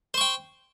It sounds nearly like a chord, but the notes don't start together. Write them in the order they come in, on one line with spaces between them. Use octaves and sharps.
C5 C#6 G5